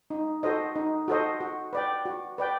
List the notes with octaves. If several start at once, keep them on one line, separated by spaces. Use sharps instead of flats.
D#4
F#4 A4 C5 D#5
D#4
F#4 A4 C5 D#5
F#4
B4 D5 G5
F#4
B4 D5 G5